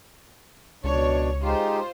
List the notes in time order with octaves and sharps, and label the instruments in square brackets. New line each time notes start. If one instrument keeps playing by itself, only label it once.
[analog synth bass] C#2 [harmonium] B2 D4 [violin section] C#5
[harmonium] G#3 D#4 G4 [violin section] F4 C5